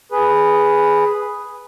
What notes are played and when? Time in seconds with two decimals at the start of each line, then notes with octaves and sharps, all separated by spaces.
0.12 G#4 B4